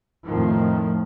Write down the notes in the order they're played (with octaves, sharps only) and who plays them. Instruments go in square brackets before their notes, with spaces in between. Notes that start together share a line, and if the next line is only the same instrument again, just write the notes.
[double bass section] F2 A2 D#3 F3